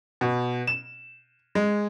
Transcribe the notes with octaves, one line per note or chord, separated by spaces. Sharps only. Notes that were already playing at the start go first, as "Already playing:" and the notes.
B2
E7
G#3